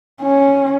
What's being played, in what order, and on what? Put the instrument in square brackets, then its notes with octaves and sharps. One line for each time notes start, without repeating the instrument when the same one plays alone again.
[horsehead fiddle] C#4